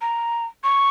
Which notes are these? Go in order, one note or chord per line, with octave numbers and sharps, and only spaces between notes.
A#5
C#6